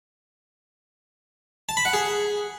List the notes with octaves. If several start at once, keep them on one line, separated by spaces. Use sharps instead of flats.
A5
B5
F#5
G#4